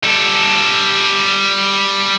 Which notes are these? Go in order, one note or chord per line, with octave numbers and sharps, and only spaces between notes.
G3 A4